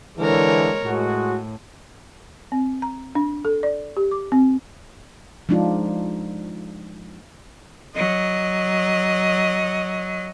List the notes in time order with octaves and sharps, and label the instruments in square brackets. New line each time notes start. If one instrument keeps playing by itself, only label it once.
[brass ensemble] D3 E3 [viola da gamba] G#3 A#4 C#5
[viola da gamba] A2 [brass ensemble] G#3 F#4
[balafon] C4
A#5
D4
A4
D5
G4
D6
C4
[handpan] F3 G#3 D4 D#4 F4
[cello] F#3 D#5